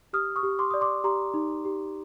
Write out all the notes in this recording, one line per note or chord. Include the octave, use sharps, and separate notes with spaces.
G4 D#6 F6
C#6 D#6
G4
C6 D6
D5 D#6
C6 D6
G4 A#5 C6
D#4
G4